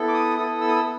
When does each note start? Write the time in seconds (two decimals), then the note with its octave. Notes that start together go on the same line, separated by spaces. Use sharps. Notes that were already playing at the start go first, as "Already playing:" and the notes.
Already playing: B3 E4 A4
0.08 D6
0.14 D#6
0.37 B3 E4 A4 D#6
0.61 E6
0.68 D#6
0.76 E6
0.84 B3